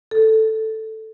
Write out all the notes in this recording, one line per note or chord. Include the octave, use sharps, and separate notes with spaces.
A4